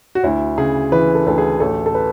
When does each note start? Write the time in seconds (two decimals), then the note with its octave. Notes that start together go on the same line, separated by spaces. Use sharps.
0.15 F#4
0.23 D2 E4
0.58 C#3 G#4
0.92 E3 B4
1.15 A4
1.26 D2 A4
1.38 G#4
1.60 A1 A4
1.86 A4
1.95 B4